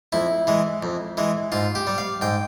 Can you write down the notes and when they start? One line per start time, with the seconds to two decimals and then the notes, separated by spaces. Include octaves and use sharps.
0.12 F2 E4
0.47 E3 G#3
0.83 F2
1.17 E3 G#3
1.52 G#2 F4
1.75 G4
1.87 G3
1.98 F5
2.21 G#2 G5